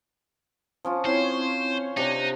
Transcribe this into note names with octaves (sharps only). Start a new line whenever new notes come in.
F3 C#4 F4
C4 E4 C5 C#5
C3 D4 D#4